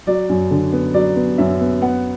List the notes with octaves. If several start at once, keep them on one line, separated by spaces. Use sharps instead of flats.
F#3 D5
F#2
D3
B3
F#3 D5
B3
F#2 E5
B3
B3 F#5